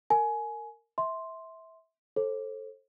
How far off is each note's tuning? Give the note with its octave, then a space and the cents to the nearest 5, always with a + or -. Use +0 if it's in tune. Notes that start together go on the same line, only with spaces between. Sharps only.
A#4 -25 G#5 +20
E5 -20 C6 +0
A4 +0 C5 +35